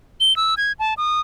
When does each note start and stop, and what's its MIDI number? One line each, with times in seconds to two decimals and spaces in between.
0.21 0.36 103
0.36 0.55 88
0.57 0.72 92
0.79 0.94 81
0.97 1.20 87